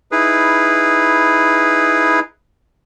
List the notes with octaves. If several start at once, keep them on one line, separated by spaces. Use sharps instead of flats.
D#4 E4 G#4 B4